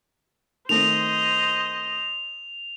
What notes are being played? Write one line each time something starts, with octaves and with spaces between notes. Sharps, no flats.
D#3 A3 C4 C5 D#5 F7